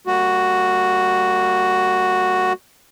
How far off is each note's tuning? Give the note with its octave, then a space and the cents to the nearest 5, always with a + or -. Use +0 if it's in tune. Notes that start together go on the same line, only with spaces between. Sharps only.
G3 +0 A#3 -30 F#4 +0